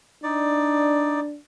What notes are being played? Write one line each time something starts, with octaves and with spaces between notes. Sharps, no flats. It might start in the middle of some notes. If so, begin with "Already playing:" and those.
D4 D#4 D5